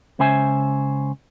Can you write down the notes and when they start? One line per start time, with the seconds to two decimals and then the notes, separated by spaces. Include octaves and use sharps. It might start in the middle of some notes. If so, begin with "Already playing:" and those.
0.19 C#2 C#3 C#4 C5 E5 G#5